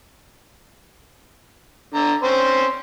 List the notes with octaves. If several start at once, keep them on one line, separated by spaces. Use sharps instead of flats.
D3 A#5
C4 C#4 C5